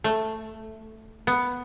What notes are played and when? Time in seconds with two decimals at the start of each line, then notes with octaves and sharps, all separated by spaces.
0.04 A3
1.27 B3